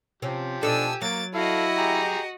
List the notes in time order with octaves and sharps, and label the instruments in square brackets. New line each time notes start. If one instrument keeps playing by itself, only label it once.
[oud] C3 C4 C#4 [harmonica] F3 G4
[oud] B2 D#4 A4 [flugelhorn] D4 [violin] G#5 E6
[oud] F#3 [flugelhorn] A#3 [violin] A6 D7
[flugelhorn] E4 [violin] F#4 D#5 [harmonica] A4 F5
[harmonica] G4 G#4 A#5